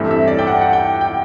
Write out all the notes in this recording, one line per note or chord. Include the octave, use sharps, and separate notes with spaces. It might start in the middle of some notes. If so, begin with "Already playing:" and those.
Already playing: G2 E3 A3 C4 E5
E5
D5
G5
F#5
F#5
G5
G5